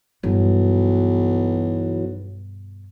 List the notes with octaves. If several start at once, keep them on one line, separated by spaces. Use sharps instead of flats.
B1 G2 B2 E3 F#3